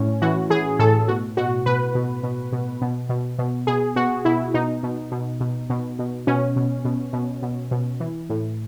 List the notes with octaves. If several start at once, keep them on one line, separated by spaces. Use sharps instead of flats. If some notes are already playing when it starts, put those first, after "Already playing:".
Already playing: A2 C#4
E3 F#4
E3 G#4
A2 A4
B2 F#4
B2 F#4
B2 B4
B2
B2
B2
B2
B2
B2
B2 G#4
B2 F#4
B2 E4
B2 D#4
B2
B2
B2
B2
B2
B2 C#4
B2
B2
B2
B2
B2
E3
A2